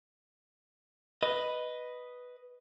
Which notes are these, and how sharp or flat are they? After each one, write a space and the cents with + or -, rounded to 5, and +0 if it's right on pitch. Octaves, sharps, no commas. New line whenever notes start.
B4 +0 D#5 +0